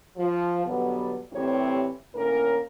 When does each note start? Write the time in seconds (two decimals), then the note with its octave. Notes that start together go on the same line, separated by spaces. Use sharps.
0.17 F3
0.66 B2 D3 F#3 G3 B3
1.33 A2 C3 E3 G3 C4 C#5
2.15 A2 D3 A#3 C#4 A#4